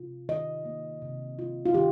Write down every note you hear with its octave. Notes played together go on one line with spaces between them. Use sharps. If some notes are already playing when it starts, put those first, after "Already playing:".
Already playing: C3 F4
D#3 D#5
A#3
C3
F4
F4
D#3 G4